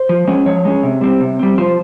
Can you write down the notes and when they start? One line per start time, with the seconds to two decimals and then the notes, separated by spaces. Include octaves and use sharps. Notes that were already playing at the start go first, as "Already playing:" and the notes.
Already playing: C5
0.09 F3
0.27 G#3 C#4
0.46 F3 C#5
0.65 G#3 C#4
0.83 C3
1.01 G3 C4
1.21 C3
1.39 G3 C4
1.58 F3 C5